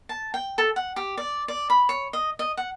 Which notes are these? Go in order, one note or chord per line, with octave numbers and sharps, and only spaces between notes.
A5
G5
A4
F#5
G4
D5
D5
B5
C#5
D#5
D#5
F#5